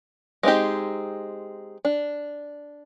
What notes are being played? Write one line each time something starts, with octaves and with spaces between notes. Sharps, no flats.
G#3 C4 D#4 G4
D4